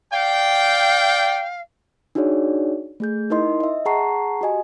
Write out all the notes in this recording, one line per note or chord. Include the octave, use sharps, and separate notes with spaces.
D5 F5 G5
D4 D#4 F#4 G#4 C#5 D5
A3 G#4 G6
D#4 E4 A#4 D#5 C6
D#5 E5
G#4 F#5 A5 A#5 C#6 C7
F#4 G4 D#5 G#5